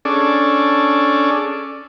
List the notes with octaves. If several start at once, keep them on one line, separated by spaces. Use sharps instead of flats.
C#4 D4 G#4 A4 D5